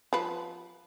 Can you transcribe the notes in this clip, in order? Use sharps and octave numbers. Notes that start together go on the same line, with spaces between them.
F3 B4